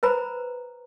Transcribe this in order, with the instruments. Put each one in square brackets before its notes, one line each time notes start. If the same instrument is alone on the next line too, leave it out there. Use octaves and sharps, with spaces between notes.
[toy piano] B4 C5 A#5 B5